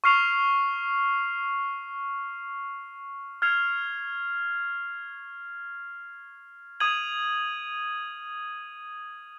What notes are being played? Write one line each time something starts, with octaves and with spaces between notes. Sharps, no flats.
C#6 F6 C7 F7
F6 G#6 C7 F7
D#6 G#6 D#7 F#7